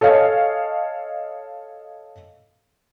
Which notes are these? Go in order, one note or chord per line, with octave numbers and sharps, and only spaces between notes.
A4 C#5 D#5 F5 G#5